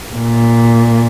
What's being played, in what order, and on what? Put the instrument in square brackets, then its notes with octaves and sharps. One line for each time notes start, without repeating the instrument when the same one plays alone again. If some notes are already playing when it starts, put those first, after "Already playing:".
[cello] A#2